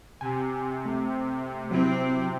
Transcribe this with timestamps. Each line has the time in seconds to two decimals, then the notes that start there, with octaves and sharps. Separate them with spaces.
0.21 C3 G#5
0.85 A3
1.71 F#3 C4 E4